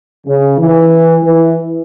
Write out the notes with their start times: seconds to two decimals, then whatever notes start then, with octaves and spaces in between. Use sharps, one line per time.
0.26 C#3
0.58 E3
1.24 E3